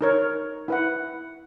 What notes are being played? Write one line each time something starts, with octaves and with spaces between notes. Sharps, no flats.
D#4 A#4 C#5
E4 B4 F#5